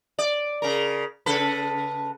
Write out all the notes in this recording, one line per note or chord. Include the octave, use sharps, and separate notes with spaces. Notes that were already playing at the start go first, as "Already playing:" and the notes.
D5
C#3 A#4
C#3 A4 B4